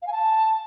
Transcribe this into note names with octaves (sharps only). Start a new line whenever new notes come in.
F5
G#5
A5